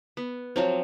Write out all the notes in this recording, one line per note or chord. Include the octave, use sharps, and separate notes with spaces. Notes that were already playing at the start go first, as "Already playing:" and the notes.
B3
F3 F#3 C4